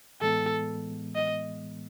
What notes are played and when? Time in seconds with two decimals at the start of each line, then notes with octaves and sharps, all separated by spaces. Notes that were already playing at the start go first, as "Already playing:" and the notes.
0.21 A2 E3 G#3 B3 A4
1.15 D#5